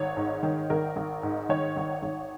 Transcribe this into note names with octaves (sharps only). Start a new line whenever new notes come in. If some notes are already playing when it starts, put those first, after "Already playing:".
Already playing: G#1 C#5
G#2
D#3
G#1 A#4
G#1
G#2
D#3 C#5
G#1
G#1